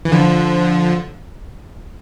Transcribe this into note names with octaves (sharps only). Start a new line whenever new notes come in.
E3
D3 F3